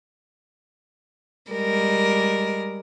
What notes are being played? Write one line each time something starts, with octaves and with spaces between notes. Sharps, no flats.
G3 G#3 A#4